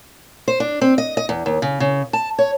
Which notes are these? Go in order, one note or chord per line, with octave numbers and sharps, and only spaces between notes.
C5
D4
C4
D#5
D#5
E2
D#2
C#3
C#3
A5
C#5